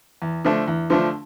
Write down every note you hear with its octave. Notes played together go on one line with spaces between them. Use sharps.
E2
D3 F3 A3 D4
E2
D3 F3 A3 D4